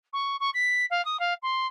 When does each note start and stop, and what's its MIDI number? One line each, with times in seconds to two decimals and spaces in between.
0.13 0.36 85
0.40 0.50 85
0.54 0.85 95
0.90 1.04 77
1.05 1.19 87
1.19 1.34 77
1.42 1.67 84